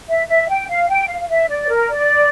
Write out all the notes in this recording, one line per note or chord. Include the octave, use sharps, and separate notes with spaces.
E5
E5
G5
F5
G5
F5
F5
E5
D5
C#5
A#4
D5